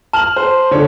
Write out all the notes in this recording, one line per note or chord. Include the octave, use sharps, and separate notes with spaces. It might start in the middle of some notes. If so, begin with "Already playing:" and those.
A5 F6 F#7
C5
D3 C#5